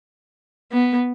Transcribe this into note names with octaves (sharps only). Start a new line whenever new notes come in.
B3